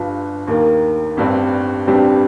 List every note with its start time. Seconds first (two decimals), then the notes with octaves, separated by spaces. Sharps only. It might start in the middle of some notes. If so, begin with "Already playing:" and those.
Already playing: G1 G2 F3
0.47 D#2 D#3 A#3
1.17 G1 G2 G3 C4
1.87 G1 G2 G3 C4 G4